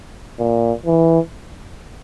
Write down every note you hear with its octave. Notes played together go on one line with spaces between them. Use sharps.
A#2
E3